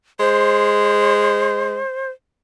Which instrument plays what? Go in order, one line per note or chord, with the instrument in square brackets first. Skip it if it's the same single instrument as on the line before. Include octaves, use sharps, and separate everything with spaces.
[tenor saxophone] G#3 [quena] C5